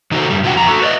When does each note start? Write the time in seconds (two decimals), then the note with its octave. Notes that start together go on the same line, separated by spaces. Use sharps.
0.11 D#3 D#4 F#4 A4 C5
0.30 F#2 G3
0.43 B2 D3 F4 F#4 F#5 G5
0.56 F2 A#5
0.67 F#4 A4
0.82 B4 D5 D#5